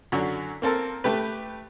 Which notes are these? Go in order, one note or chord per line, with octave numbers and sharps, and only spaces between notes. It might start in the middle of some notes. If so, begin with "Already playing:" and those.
F#2 D3 F#3
A#3 C4 A4 A#4
A3 G4 B4